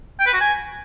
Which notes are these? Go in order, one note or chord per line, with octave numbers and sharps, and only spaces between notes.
G5
B4
F#4
G#5